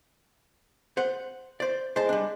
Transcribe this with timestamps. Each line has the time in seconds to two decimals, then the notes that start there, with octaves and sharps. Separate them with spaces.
0.97 C5 F#5
1.60 C5 D5
1.96 G#3 C5 A5
2.09 G3 D4